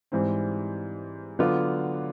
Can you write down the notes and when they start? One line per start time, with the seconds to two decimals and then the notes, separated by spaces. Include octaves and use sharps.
0.12 G#2 E3 G3 C4
1.39 D3 F#3 B3 D4 F4